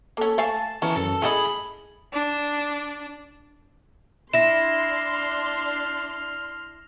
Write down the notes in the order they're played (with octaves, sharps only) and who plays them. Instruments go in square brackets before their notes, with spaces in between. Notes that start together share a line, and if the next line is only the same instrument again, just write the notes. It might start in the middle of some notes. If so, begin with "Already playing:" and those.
[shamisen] A#3 C#4 [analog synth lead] A4
[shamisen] A3 F5 G#5 [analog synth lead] A5
[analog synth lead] E3 [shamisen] C#4 [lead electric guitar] A#4 A5
[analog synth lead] F#2 [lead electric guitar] A4
[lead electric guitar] A2 B5 [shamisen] E4 A4 D#5 [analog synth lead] G#4
[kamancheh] D4
[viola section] D4 C6 [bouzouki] E4 [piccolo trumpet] F6 [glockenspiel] A#6 E7